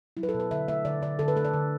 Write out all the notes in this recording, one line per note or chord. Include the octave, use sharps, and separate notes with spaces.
F#3 E4
B4
A4
B2
B4
D3 E5
A3 E5
D3 D5
D3 D5
D3 A4
B4
A3 A4
D5
D3